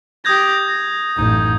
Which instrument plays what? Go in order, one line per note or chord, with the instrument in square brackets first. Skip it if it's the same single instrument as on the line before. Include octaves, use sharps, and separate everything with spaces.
[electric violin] G4 A#6 [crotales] D#6 G6 G#6
[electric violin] A#6
[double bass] A1 F#2 [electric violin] D#4